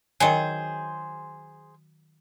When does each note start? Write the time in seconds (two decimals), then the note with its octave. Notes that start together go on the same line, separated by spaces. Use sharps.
0.20 D#3 F#3 G#4 C5